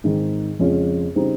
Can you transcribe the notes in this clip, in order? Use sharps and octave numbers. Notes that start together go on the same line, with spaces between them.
G#2 D#3 G#3 C4
F2 C#3 G#3 C#4 F4
C#3 G3 C4 D#4